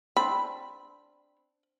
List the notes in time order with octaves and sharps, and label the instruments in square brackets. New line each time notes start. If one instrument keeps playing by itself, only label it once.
[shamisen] C4 D4 [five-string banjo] B5